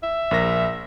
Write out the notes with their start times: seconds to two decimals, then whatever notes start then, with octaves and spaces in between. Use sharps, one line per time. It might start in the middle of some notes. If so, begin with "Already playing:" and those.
0.03 E5
0.31 A#1 A#4 A#6